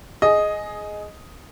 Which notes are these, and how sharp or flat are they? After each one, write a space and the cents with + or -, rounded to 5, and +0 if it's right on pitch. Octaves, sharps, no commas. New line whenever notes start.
G#4 +15 D#5 +0